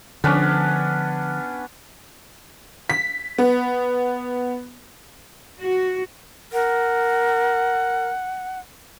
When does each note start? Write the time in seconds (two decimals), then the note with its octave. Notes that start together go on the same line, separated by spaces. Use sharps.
0.24 D3 F3 B3 C#4 D4
2.89 B6
3.38 B3
5.61 F#4
6.53 A#4 F#5